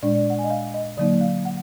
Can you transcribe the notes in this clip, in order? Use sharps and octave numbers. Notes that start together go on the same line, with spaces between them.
A#2 G#3 D4 D5
D5
F#5
G#5
D#5
F5
D#5
D3 F#3 A#3 D#4 D5
F5
F#5